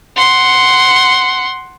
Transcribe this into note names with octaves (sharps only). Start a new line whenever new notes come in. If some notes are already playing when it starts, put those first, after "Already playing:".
F#5 C6